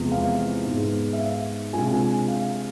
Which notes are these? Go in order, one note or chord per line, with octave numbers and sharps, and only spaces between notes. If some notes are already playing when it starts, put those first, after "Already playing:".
Already playing: E2 C3 F3 G#3 B3
F5
G#2 G#3 B3
E5
F5
C3 G#3 D4 F4 G#5
G#5
F5